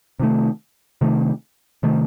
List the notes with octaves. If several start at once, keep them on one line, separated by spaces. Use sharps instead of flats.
C3 D#3 A3
C3 D#3 A3
C3 D#3 A3